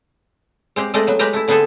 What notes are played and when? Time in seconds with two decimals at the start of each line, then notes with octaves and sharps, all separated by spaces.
0.76 G#3 C4 G4
0.94 G#3 A3 C4 D5 D#5
1.07 F#3 B3
1.19 G#3 G4 B4 G5 A#5
1.33 A3 E4
1.48 D3 B3 C4 G#4 A4